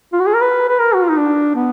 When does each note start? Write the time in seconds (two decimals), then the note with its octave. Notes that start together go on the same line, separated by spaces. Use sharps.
0.13 F4
0.20 F#4
0.27 G#4
0.34 A#4
0.41 B4
0.69 B4
0.79 A#4
0.94 F#4
1.02 F4
1.10 D#4
1.17 D4
1.56 B3